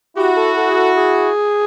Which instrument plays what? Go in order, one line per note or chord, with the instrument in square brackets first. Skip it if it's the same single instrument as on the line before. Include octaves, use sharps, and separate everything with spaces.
[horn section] E4 F#4 [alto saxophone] G4
[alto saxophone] A4
A4
G#4
A4
G#4